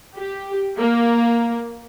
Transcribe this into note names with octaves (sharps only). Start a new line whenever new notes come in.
G4
A#3